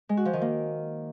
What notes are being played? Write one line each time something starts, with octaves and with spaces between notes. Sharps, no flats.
G#3
F#4
F3
D#3
A#3